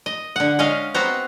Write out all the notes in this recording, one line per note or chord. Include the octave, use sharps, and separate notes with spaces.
D#5
D3 F#5
G#3 C#4 D#5 F5
B3 C4 F#4 C5 A#5